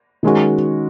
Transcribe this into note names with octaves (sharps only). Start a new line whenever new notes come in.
D#3 G#3 C#4 F#4